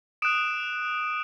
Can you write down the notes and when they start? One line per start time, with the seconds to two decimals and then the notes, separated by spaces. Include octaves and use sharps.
0.22 D#6 F#6 D7 E7